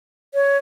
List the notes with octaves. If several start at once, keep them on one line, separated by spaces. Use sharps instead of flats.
C#5